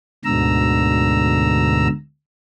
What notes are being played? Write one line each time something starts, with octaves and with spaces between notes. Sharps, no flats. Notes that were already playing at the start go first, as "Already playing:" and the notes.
D2 G#2 B2 D3 A#5 E6